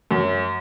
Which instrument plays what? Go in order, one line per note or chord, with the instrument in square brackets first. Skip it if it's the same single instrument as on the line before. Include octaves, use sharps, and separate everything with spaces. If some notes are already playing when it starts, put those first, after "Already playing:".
[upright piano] F#2